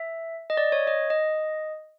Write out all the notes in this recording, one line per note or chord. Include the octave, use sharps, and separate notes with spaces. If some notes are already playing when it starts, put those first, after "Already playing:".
Already playing: E5
D#5
D5
C#5
D#5
D#5